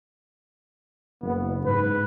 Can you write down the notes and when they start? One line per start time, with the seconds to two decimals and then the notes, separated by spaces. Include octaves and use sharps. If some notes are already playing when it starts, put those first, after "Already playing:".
1.22 F#1 B3
1.65 G#2 B4